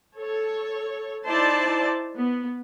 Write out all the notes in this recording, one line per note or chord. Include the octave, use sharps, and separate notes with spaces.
A4 C#5
D#4 E4 C5 D5 A5
B3